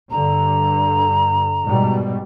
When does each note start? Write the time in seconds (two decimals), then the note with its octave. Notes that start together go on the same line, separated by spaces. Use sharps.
0.11 G2 D3 A#5
1.64 G#2 B2 G3